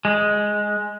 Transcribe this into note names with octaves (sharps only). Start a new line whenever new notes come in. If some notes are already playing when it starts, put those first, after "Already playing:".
G#3